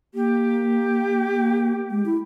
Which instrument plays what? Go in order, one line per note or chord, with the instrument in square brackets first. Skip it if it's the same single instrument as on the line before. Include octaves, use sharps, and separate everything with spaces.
[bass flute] A#3 [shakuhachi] G4
[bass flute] A#3
G#3
E4